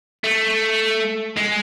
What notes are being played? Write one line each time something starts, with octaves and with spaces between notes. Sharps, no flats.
A3
G#3